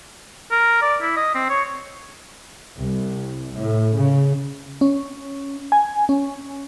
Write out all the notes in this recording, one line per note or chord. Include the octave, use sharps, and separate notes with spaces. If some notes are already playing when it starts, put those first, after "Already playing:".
A#4
D5
E4
D#5
C4
C#5
C2
A2
C#3
C#4
G#5
C#4